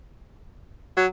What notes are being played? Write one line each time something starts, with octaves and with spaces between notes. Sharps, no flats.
F#3